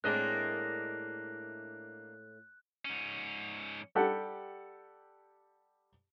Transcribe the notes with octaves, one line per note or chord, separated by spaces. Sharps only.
A2 G#3 A#3 C4 D4 D#5 F#6
G#2 C#4
G3 G4 A4 F#5